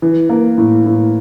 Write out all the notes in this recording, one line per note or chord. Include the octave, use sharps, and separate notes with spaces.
E3
A#3
A2
A2